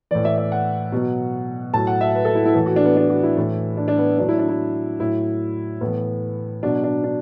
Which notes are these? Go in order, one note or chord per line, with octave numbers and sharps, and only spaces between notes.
A2 E3 D5
E5
E5
F#5
B2 F#3
A2 F#3 A5
F#5
E5
B4
A4
E4
E4
A2 E3 A4
F#4
D4
B3
D4
F#4
E4
A2 E3
D4
D4
B3
A2 F#3 D4
E4
D4
E4
A2 F#3 E4
A2 E3 B3
B2 F#3 D4
D4
D4